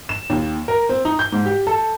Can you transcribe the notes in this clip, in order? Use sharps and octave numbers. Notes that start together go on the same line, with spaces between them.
E7
D#2
A#4
C4
D#4
G6
G#2
G4
A4